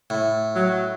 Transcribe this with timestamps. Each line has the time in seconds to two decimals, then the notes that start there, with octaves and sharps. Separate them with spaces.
0.10 A2
0.55 F#3